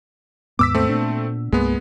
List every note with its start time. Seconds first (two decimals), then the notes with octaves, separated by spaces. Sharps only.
0.59 D#2 G#2 B3 D6 E6 B6
0.75 A3 C4
0.89 A#2 B3 D4
1.52 C2 G2 G#3 A#3 B3